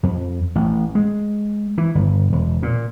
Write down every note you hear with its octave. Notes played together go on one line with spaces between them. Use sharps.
F2
A1
G#3
E3
G1
E1
A#2